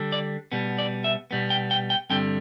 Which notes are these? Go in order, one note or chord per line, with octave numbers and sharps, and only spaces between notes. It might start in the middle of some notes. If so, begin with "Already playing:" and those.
Already playing: D3 G3 D4
D5
B2 G3 B3
D5
E5
B2 G3 B3
G5
G5
G5
G2 D3 G3 C4 G5